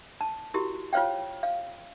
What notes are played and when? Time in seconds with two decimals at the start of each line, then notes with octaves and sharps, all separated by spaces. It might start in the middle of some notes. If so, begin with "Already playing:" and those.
0.21 A5
0.54 E4 F#4 G4 A#4
0.93 F4 C5 C#5 F5 G5
1.43 F5